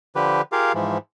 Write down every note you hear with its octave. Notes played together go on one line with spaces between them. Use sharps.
D3 F3 G4 B4
F4 G4 G#4 A#4 F5
G#2 E3 F3